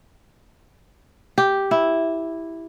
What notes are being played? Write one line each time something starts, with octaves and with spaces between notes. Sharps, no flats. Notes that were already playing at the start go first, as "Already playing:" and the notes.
G4
E4